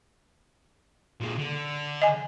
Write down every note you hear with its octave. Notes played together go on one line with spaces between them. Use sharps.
A#2 G#3
D3
D#5 G#5